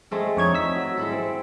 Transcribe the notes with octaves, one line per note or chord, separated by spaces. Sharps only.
G#3 A3 C4
F2 D4 D#4 C#5 G#6
E6 B6
F#3
G#3 E4 A4
C4